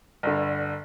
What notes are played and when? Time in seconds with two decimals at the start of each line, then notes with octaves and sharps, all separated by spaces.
0.23 G1 G2 D3